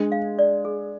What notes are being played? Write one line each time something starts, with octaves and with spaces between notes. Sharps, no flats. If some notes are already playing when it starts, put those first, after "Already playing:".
Already playing: G#3 D4
F5
D5
G#4